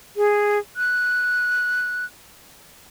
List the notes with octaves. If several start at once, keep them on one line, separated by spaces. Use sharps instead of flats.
G#4
F#6